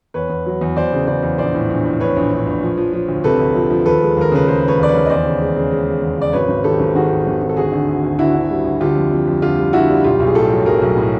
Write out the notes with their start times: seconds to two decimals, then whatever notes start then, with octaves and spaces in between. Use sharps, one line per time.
0.14 E2 B4 C#5
0.30 E2
0.46 F#3
0.61 E2
0.76 E2 C5 D5
0.93 C#3
1.07 C#3 C5 D5
1.23 E2
1.38 A#1 C5 D5
1.54 A2
1.70 A#1
1.85 A2
2.00 A#1 B4 C#5
2.16 A#1
2.32 A#1
2.47 A#1
2.63 F3
2.77 F3
2.93 F3
3.08 D2
3.24 C3 A4 B4
3.40 D2
3.55 F3
3.70 F3
3.86 D#2 A4 B4
4.02 G#3
4.17 D#2 A#4
4.32 C#3 B4
4.47 G#3 A#4 C5
4.63 C#3 B4 C#5
4.79 D#2 D5
4.88 B4 C#5
4.94 D#2
5.06 D#5
5.10 E2 C5 D5
5.26 C#3
5.41 G#3
5.56 C#3
5.71 G#3
5.87 G#3
6.02 E2
6.18 C#3 D5
6.33 G#1 B4 C#5
6.48 G#1
6.64 D#3 G4 A4
6.79 G#1
6.95 D#3 F#4 G#4
7.10 G#1
7.26 G#1
7.41 D#3
7.49 A4
7.57 D2 F#4 G#4
7.72 D3
7.88 D2
8.03 D2
8.19 D3 E4 F#4
8.35 D3
8.50 G3
8.65 D2
8.81 D3 F4 G4
8.96 F2
9.11 F2
9.27 F2
9.42 D3 F4 G4
9.59 G3
9.73 D3 E4 F#4
9.90 G3
10.04 B1 F4 G4
10.20 B1
10.27 G#4
10.35 A2 G4 A4
10.51 F#3
10.66 B1 G#4 A#4
10.82 B1
10.97 A2